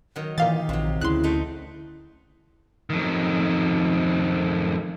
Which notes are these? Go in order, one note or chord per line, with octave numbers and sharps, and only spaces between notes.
D#3 F#3
A#2 D#3 E3 D#4 G4 F5 A6
A#1 C3 F#3
D2 C#3 E4 C6 F#6
A3 C4 D#4
F2 D#3